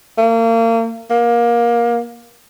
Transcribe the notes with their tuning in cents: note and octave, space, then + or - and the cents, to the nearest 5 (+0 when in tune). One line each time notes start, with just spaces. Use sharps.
A#3 -35
A#3 +20